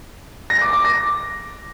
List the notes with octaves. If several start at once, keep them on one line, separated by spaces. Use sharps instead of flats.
A#6
D6
D6
A#6